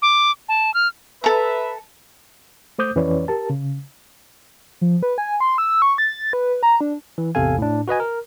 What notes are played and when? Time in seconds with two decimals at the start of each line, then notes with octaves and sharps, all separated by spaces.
0.02 D6
0.49 A5
0.74 F6
1.24 A4 B4 E5 A#5
2.79 A3 C5 D6 D#6 G6
2.96 F2 E3 C#4 B4 C#5 D5
3.28 G4 A#4 A5
3.50 C#3
4.81 F3
5.03 B4
5.18 G#5
5.40 C6
5.58 E6
5.82 C#6
5.98 A6
6.33 B4
6.63 A#5
6.81 D4
7.18 E3
7.35 A1 E2 C3 A4 F5 G#5
7.58 A2 D4
7.88 F#4 B4 D#5 G#5
8.00 A#4